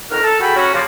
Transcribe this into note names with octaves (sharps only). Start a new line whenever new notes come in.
F2 D#3 F#4 A#4 F6
A4
F#4 G#4 A4 G5 B5
F#3 C#4 F#4
C#3 F3 A#3 D5